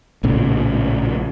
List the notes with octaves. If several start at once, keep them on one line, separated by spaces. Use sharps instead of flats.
A#1 A2 C#3